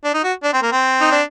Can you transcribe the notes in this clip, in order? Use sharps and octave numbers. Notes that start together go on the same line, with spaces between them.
D4
D#4
F#4
D4
C4
A#3
C4
D#4
D4